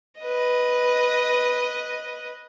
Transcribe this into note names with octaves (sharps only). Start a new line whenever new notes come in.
B4 D#5